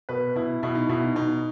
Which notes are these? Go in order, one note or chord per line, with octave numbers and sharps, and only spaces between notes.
B2 B4
B2 E4
B2 E4
D#4
B2 E4
D#4
B2 D#4